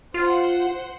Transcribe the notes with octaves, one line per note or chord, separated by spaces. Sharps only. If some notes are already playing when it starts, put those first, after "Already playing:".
F4 C5 F#5